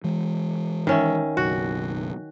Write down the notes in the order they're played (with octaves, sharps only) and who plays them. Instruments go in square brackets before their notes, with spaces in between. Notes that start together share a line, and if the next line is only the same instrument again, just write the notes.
[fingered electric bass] E3 G#3
[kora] D#3 C#4 E5
[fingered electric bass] F#1 B1 [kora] F#4